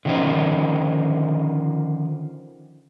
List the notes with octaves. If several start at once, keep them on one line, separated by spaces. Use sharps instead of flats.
D3 D#3 F3 C#4 D#4 C5